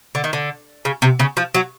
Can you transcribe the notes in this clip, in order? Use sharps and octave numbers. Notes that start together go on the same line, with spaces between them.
D3
D#3
D3
C#3
C3
C#3
F3
F#3